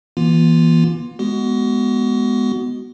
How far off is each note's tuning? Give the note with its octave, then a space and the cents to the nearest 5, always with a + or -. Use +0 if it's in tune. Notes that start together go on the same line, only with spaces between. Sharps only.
E3 +0 A#3 +35 F4 +0
G#3 +10 B3 +0 F#4 +25